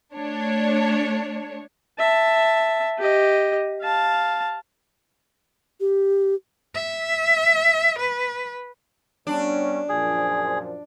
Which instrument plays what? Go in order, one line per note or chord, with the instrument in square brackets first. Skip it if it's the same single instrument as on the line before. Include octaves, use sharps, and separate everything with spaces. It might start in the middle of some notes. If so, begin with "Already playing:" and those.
[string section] A3 D4 C#5
[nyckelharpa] E5 A5
G4 D#5
F5 A5
[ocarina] G4
[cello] E5
B4
[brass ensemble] G3 B3 C#4 [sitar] D4
[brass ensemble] F#2 A#2 F3 [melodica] G#4